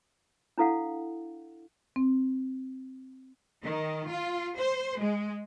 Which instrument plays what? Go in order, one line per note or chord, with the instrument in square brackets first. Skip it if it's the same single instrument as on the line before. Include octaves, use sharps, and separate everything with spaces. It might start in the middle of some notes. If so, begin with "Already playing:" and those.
[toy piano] D4 E4 A4 F5 F#5
[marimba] C4
[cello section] D#3
F4
C5
G#3